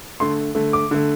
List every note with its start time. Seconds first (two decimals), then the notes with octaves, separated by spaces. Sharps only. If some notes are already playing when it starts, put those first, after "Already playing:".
0.20 D3 A3 C6
0.55 D3 A3
0.73 D6
0.91 D3 A3